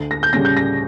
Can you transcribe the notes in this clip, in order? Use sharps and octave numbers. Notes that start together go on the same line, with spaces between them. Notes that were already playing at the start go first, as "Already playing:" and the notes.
Already playing: D2
A#6
G6
C#3 G3 C#4 A#6
G6
A#6